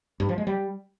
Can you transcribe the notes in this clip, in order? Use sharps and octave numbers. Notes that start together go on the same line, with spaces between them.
G2
F3
G#3
G3